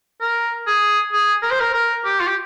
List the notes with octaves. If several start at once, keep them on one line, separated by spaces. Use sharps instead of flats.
A#4
G#4
G#4
A#4
C5
A#4
A#4
G4
F4
G4